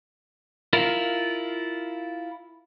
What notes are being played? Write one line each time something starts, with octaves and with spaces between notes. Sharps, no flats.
E4 F4 A#4